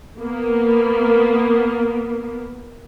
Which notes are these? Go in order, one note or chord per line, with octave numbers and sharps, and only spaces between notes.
A#3 B3